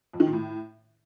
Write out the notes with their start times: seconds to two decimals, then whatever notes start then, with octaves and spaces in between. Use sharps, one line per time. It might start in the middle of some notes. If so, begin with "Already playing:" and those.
0.13 F2
0.20 D#3
0.26 A#2
0.33 A2